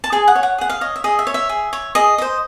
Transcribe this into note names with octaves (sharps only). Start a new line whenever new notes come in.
A5
G#4 G#5
F#5
C#5
F#5
G#4 F#5
F5
C#5 D#5
E5
G#4 D#5
E5
C#5
E5
G#4
C#5
G#4 D#5
C5 D#5